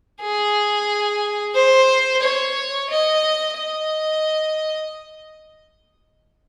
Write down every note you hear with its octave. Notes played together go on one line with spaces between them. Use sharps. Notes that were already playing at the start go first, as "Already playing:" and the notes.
G#4
C5
C#5
D#5
D#5